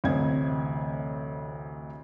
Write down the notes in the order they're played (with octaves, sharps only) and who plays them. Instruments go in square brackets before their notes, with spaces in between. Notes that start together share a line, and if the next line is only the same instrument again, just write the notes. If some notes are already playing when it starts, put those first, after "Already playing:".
[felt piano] A1 D2 C3 C4 D#5 G#6